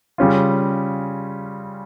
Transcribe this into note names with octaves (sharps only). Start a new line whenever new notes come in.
C#3 G3 C#4 F4